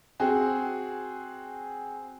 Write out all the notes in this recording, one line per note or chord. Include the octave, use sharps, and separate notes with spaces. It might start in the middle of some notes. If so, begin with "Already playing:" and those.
C4 F#4 G#4